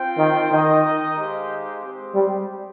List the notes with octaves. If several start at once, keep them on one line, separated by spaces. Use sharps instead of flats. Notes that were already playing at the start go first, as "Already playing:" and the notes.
Already playing: C4 F4 C5 G5
D#3
D#3 D#4 A#4 D#5
G#3 D#4 G4 C5 F5
G#3 C4 G4 C5
G3